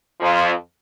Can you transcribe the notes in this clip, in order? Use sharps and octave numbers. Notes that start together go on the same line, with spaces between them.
F2 F3